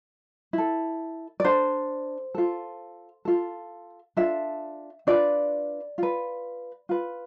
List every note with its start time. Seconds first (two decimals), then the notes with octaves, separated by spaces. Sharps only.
0.53 E4 A4
1.40 D5
1.45 D4 A4 C5
2.35 F4 A4
3.25 F4 A4
4.17 D4 F4 A4 E5
5.07 D4 F4 B4 D5
5.98 F4 B4
6.89 F4 B4